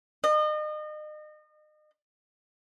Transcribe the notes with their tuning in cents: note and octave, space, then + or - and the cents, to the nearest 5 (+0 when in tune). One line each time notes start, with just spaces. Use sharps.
D#5 -35